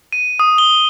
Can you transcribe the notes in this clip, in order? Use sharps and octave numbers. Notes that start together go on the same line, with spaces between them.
D#7
D#6
G7